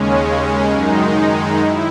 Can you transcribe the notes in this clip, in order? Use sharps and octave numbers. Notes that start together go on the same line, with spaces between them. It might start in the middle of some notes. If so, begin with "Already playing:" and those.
Already playing: D#2 C#3 G#3 C#4
F#2 D#3 G#3 D#4
E4